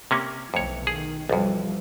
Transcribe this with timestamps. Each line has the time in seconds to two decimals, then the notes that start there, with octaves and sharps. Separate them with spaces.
0.11 C3 A#3 C#4
0.54 B1 F2 E3 A3 C#5
0.87 D#3 G#4
1.30 B1 F2 E3 F3 G3